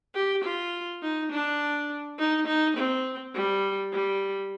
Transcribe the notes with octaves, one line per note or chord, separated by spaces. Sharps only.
G4
F4
D#4
D4
D#4
D#4
C4
G3
G3